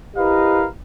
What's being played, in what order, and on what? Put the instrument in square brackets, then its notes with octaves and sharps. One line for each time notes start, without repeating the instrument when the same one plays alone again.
[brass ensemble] E4 G4 A#4 B4 D#5 F5